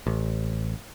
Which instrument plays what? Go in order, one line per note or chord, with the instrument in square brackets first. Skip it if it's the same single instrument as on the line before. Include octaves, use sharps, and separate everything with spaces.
[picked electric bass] A1